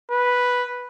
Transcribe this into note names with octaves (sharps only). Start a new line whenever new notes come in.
B4